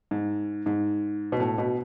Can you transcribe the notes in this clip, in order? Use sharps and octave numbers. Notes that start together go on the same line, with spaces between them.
G#2
G#2
B2
A2
B2